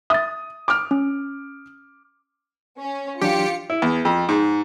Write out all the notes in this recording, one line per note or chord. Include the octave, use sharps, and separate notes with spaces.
E5 D#6 A6
D6 F6
C#4
C#4
E3 F#3 D4 F4 G4 C#7
E4
E2
F2
G#2